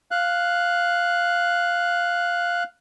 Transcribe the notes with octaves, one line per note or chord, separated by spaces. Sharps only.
F5 F#6